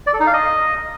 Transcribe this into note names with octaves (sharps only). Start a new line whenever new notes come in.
D5
A4
D#4
F5
D#5